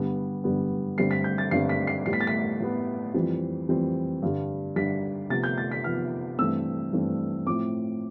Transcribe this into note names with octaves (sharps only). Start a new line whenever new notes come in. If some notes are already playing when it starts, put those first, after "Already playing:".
Already playing: G2 D3 G3 B3
G2 D3 G3 B3
G2 D3 G3 C4 C7
B6
G6
A6
G2 D3 G3 C4 C7
B6
C7
A2 G3 B3 C7
B6
A6
B6
A2 G3 B3
F2 E3 G3 C4
F2 E3 G3 C4
G2 D3 G3
G2 D3 G3 B6
C3 F3 B3 A6
G6
A6
B6
C3 F3 B3 F6
G2 E3 A3 C4 E6
G2 E3 A3 C4
A2 F3 C4 D6